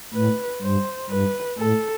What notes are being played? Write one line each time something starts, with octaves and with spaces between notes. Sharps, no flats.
A2 B4
G2 C5
G2 B4
A2 A4